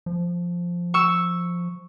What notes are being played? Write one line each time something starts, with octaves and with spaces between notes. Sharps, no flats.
F3
C#6 E6